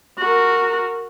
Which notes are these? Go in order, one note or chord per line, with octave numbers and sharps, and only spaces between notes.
F#4 A#4